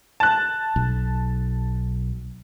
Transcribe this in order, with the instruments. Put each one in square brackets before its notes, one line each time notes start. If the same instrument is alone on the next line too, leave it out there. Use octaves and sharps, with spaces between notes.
[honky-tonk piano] A5 F#6
[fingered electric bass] B1